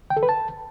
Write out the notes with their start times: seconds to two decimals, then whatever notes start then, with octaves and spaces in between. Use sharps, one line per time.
0.10 G5
0.17 A4
0.23 B4
0.29 A5